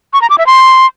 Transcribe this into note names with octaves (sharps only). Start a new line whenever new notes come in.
C#6
A#5
D6
E5
C6